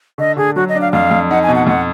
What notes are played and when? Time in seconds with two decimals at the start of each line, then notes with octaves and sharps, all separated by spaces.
0.18 D3 D#5
0.37 D3 G#4
0.56 F#3 F#4
0.69 D#5
0.75 D4
0.81 F5
0.93 F2 F5
1.11 F2
1.30 D#4 F#5
1.43 G#5
1.48 B2
1.55 F#5
1.67 F2 F#5